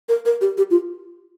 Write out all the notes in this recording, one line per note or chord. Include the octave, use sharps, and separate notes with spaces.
A#4
A#4
G4
G4
F4